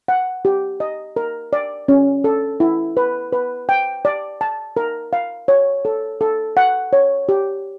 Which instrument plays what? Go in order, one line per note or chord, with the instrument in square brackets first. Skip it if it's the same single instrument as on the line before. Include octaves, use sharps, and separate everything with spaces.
[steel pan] F#5
G4
D#5
A#4
D5
C#4
A4
E4
B4
B4
G5
D5
A5
A#4
F5
C#5
A4
A4
F#5
C#5
G4